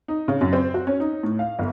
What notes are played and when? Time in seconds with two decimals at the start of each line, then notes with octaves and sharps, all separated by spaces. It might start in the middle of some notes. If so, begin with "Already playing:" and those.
0.08 D#4
0.28 C#3
0.41 F#2
0.53 C4
0.74 F#4
0.87 C#4
1.00 D#4
1.23 A2
1.39 F5
1.59 G1